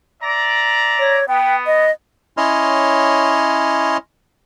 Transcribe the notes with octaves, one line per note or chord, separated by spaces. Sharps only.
D5 E5 A#5
C#5
B3 G5
D#5
C#4 E4 C#5 D#5 C6 F6